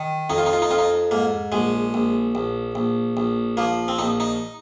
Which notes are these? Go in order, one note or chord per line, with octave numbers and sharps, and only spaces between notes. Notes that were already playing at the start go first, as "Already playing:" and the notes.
Already playing: D#3
F2 D#4
F4
D#4
F4
D#4
F2 F4
D#4
G#2 A#3
A#1 G#3
A#1
A#1
A#1
A#1
F3 A#3
C4
A#1 D#4
D#4